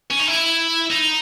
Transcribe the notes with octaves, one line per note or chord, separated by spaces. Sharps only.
C#4
D#4
E4
D#4